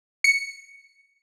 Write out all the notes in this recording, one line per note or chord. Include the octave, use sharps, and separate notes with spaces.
C#7